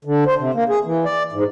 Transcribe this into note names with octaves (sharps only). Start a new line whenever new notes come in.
D3
C5
C3
A#3
G#4
E3
D5
G#2